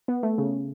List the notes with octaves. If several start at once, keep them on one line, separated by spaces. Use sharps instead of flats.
B3
A3
C#3